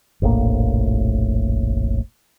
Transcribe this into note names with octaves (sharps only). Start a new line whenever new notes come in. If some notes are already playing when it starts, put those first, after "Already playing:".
F1 A#1 A2 A#3